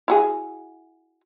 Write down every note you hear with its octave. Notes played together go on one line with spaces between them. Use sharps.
E4 F#4 G#4